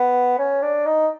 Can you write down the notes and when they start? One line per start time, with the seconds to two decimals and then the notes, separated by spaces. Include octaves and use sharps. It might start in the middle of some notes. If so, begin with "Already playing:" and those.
Already playing: B3
0.39 C#4
0.62 D4
0.86 D#4